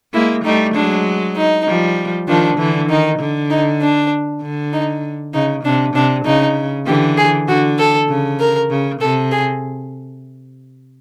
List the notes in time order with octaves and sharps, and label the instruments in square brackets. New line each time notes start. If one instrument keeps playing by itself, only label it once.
[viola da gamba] G#3 A#3 [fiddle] E4
[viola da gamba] G3 A3 [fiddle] D#4
[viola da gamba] F#3 G#3 [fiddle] D4
[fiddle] D#4
[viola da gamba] F3 G3
[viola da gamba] D#3 F3 [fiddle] D4
[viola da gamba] D3 E3
[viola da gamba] D#3 [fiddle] D#4
[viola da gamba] D3
[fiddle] D#4
D4
[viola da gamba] D3
[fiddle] D#4
[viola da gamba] C#3 [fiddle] D#4
[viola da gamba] C3 [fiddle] D4
[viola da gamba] C3 [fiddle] D4
[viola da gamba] C#3 [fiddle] D#4
[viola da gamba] D3 E3 [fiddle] G4
[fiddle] G#4
[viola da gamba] D3 [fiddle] F#4
[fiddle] A4
[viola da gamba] C#3
[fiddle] A#4
[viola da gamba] C#3
[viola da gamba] C3 [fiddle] A4
[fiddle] G#4